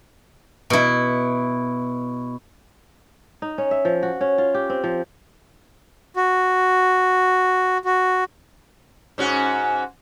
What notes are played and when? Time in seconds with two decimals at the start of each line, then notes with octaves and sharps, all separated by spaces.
0.70 B2 E4
3.42 D#4
3.58 C#4
3.71 E5
3.85 F3
4.03 F#4
4.21 C#4
4.38 F4
4.54 G4
4.70 C4
4.84 F3
6.16 F#4
7.85 F#4
9.18 G#2 C#4 F#4